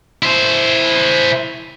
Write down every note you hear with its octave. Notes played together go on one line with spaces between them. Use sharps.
E4 C5